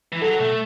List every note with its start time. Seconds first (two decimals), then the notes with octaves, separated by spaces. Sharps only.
0.12 E3
0.22 F#3 A4
0.40 B2 A3